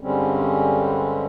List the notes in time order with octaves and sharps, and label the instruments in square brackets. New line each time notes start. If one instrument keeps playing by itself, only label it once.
[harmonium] G2 D3 G3 G#3 C4 C#4